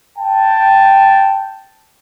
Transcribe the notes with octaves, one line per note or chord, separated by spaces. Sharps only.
G5 A5